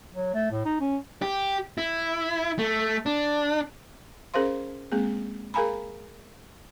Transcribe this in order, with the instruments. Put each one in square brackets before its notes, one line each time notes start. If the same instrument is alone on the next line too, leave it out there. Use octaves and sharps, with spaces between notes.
[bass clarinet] F#3
A3
A2
D#4
C#4
[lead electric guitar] G4
E4
A3
D4
[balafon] C#4 G#4 A#4 C5 F5 C6
G#3 A#3 C4 G#4
G#4 A#4 F5 G#5 A#5 B5